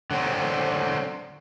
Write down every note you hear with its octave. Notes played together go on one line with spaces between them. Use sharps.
D3 F#3 C4